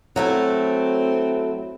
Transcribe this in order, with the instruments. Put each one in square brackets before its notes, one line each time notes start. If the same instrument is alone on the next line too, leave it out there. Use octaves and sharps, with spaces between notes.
[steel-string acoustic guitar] F#3 A3 E4 [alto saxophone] C4